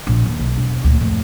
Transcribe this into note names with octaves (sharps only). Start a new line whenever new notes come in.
A#1
D#2
B1
E1
D2 A#2
F2 A2